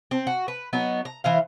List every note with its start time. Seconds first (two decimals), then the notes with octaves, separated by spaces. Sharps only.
0.11 C4
0.27 F#4
0.48 B4
0.73 F#3 B3 D#4
1.05 A#5
1.24 E3 C5 F5